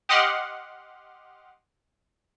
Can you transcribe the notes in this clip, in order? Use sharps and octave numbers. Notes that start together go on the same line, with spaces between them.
G4 D#5 F#5 C6 D6 F6